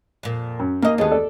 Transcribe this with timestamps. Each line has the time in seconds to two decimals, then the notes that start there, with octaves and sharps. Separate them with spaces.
0.23 F2 A#2
0.59 F#2
0.82 D#2 A#3 D#5
0.98 D#2 A3 B3 G#4 D#5
1.11 A4 D5